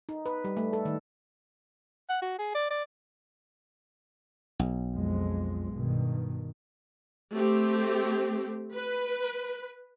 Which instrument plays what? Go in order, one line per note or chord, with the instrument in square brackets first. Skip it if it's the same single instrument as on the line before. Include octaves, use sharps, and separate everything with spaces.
[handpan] D#4
B4
G3
A3
A4
D#3
[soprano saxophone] F#5
F#4
G#4
D5
D5
[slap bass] B1
[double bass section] F2 G#3
G2 B2 D#3
[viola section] A3 C4 G4
B4